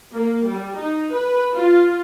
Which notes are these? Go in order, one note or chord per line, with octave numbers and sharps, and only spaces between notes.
A#3
G3
D#4
B4
F4